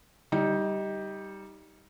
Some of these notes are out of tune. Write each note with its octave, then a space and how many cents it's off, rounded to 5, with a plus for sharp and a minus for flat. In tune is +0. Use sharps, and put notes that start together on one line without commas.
G3 +0 D#4 +20